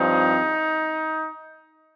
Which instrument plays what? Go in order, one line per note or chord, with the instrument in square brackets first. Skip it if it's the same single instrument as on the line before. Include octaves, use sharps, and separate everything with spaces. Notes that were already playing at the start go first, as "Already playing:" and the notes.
Already playing: [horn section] G2 F3 C4 D#4